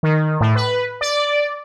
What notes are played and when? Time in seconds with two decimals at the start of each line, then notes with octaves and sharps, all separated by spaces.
0.03 D#3
0.41 A2
0.56 B4
1.01 D5